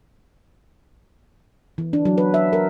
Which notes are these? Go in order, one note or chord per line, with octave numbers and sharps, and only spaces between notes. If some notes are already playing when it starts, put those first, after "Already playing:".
E3
D4
F#3
B4
E5
A#4